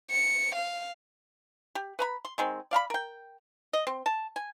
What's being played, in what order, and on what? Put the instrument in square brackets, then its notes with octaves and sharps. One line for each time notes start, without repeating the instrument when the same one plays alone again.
[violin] C#7
F5
[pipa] G4
B4 A#5 B5
C6
D#3 G#3 C4
D5 F5 A#5 B5
A#4 G5
D#5
C4
A5
G#5